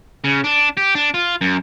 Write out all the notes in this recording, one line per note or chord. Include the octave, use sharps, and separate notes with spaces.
C#3
D4
G4
D4
F4
F#2